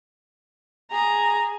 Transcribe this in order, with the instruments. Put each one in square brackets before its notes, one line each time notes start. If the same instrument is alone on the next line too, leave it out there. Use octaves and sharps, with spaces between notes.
[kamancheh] G#4 [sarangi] A#5